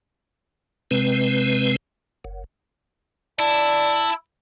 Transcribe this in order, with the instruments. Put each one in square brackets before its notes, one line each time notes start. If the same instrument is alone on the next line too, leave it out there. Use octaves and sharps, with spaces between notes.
[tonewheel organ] C3 G#3 C4 B4
F#1
[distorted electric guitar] E4 [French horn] D5 [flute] A5